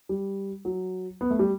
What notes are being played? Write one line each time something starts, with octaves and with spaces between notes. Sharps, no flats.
G3
F#3
B3
A3
G3